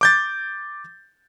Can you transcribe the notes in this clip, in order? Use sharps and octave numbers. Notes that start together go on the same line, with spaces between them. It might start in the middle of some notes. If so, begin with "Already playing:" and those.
D6 G6 A6